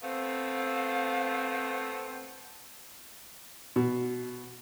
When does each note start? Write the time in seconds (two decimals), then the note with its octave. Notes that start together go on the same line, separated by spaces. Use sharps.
0.02 A3 B3 C4 F5
3.76 B2